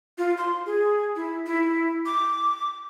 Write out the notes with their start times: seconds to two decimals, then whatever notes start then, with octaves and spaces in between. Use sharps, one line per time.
0.18 F4
0.37 C6
0.66 G#4
1.16 E4
1.46 E4
2.06 D6